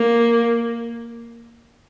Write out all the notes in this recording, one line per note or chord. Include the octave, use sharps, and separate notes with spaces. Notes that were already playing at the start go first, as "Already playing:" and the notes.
Already playing: A#3